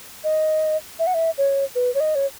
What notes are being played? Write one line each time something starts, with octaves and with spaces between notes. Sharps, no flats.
D#5
E5
F#5
E5
C#5
B4
C#5
D#5
C#5